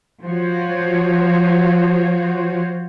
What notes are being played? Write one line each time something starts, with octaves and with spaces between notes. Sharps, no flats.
F3 F4 F#4 C5 C#5